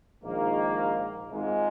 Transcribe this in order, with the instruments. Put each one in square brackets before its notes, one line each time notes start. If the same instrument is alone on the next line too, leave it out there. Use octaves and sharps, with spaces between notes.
[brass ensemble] A#1 G#2 D#3 A#3
G#1 G#2 G#3 F4